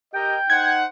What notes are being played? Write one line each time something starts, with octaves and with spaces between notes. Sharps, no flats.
G4 A#4 D#5 G5 G6
D#4 C5 F#5 G#6